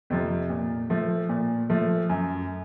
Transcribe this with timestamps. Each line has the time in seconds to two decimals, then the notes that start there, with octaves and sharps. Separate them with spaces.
0.10 F2 C3 F3
0.50 A#2
0.90 F3 A3
1.29 A#2
1.70 F3 A3
2.09 F#2